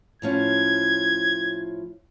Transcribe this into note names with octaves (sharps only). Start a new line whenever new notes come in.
A2 F3 C#4 G#6